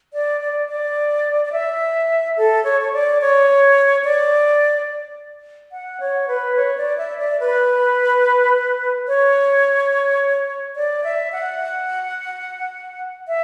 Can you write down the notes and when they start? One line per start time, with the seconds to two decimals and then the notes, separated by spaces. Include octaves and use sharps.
0.13 D5
0.40 D5
0.69 D5
1.45 D5
1.52 E5
2.37 A4
2.64 C#5
2.81 C#5
2.93 D5
3.21 C#5
4.04 D5
5.72 F#5
6.00 C#5
6.28 B4
6.56 C#5
6.77 D5
6.98 E5
7.19 D5
7.40 B4
9.08 C#5
10.76 D5
11.04 E5
11.32 F#5
13.28 E5